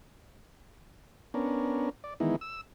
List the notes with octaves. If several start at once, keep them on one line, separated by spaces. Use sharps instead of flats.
B3 C#4 D4 A#4
D5
D#3 E3 G#3 B3 D#4 E4
E6